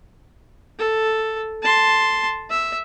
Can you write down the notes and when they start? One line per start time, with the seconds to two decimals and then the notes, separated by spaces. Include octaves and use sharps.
0.79 A4
1.63 A5 C6
2.50 E5